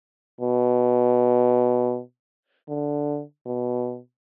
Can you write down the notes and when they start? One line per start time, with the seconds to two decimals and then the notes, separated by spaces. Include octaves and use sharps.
0.41 B2
2.69 D3
3.46 B2